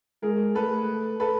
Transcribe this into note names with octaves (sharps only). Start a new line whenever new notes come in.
G#3 G#4 A#4
A3 A4 B4
A4 B4